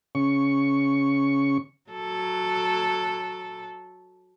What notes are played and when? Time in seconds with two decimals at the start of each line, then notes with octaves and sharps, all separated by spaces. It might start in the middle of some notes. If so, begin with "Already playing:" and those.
0.15 C#3 C#6
1.91 F#3 A4